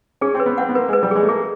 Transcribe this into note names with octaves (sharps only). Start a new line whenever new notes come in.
C#4 G#4
C4
B4
B3
C4 F#5
B3
A#3 B4
G#3
B4
G3
G#3 G#4
A3
A#3 G#4